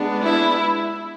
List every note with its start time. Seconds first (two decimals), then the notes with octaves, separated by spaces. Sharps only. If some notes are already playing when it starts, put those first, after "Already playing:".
Already playing: G#3 B3 D4
0.24 E4